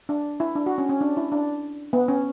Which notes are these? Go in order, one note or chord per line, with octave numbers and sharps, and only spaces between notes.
D4
E4
D4
F#4
C#4
C#4
D4
E4
D4
B3
C#4